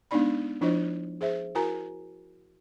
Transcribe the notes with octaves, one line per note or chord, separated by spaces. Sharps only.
G#3 B3 D4 D#4 D5 B5
F3 D4 E4 F4 C5 D#5
G#4 C5 E5
E4 F#4 A#4 G#5 A#5